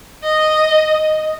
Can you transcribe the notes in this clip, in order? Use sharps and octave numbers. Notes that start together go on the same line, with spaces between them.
D#5